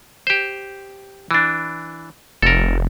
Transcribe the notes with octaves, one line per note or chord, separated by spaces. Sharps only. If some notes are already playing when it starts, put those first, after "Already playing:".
G4 C5
E3 D4
F1 A4 A#4